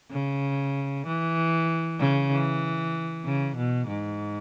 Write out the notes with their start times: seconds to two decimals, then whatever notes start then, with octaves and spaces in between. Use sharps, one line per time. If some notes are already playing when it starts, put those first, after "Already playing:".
0.11 C#3
1.06 E3
1.99 C#3
2.31 E3
3.25 C#3
3.57 B2
3.88 G#2